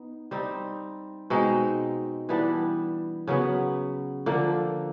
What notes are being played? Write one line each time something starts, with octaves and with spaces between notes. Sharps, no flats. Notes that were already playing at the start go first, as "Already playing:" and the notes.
Already playing: B3 D#4
G3 C4 D#4
B2 G#3 C4 D#4
E3 G3 B3 D4
C#3 F#3 B3
D3 F3 A#3